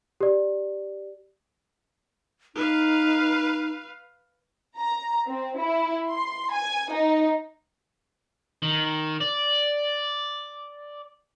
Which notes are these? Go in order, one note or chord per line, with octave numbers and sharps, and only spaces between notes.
G4 D5
D#4 B4 F5
A#5
C4
E4
C6
G#5
D#4
D#3
D5